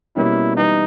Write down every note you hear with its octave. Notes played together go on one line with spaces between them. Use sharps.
B2 G3 A#3 C#4 E4
E3 G3 B3 D#4 E4